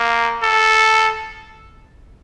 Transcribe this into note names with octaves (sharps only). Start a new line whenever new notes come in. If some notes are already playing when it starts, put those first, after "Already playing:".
Already playing: A#3
A4